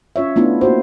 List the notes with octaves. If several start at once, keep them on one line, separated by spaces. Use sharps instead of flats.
C#4 F4 C#5 E5
A3 B3 D4 E4 F4
A#3 F#4 C5